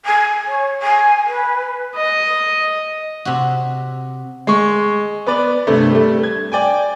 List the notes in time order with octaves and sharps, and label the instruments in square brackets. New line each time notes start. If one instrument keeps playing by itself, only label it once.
[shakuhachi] G#5
C#5
G#5
B4
[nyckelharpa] D#5
[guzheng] C3 F#4
[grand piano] G#3 C#6
B3 B4 D5
G2 C3 A3
G3 A3
G#6
D5 G5 G#5